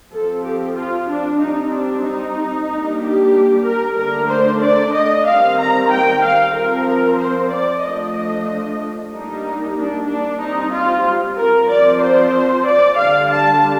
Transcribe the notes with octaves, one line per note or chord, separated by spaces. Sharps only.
F3 C4 A4
G4
F4
D4
G3 C4 D#4
D4
D#4
G3 A#3 D4
G4
A#4
D3 A3 D4 A#4
C5
D5
D#5
D#3 G3 C4 F5
A#5
G5
F5
F3 C4 A#4
C5
D5
F3 A3 D4 D#5
G3 A#3 D4 D#4
D4
D4
G3 C4 D#4
F4
A#4
F3 C4 D5
C5
D5
D3 G3 D4 F5
A5